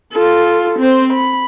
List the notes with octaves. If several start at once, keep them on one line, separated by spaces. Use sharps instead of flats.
F4 A4
C4 C5
B5